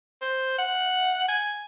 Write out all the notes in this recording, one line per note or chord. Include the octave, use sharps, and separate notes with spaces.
C5
F#5
G#5